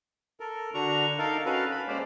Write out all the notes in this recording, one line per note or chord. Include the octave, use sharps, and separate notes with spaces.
A4 A#4
D3 D4 F#4 A#5 C#6
D#4 A4 A#4 F5
C#4 F#4 A4 B4 F5
B5
G#3 A#3 C#4 C5 D5